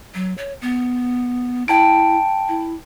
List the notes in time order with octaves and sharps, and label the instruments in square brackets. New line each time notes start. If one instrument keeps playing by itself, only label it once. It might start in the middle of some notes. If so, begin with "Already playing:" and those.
[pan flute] F#3
C#5
B3
[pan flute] E4 [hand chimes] G5 A5 D7
[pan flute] E4